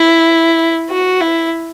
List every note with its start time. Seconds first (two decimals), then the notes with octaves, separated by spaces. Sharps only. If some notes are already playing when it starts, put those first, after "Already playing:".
Already playing: E4
0.90 F#4
1.21 E4